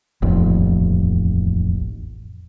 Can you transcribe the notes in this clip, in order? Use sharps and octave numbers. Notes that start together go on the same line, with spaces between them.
D#1 A1 F2